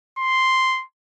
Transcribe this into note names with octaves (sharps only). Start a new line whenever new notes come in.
C6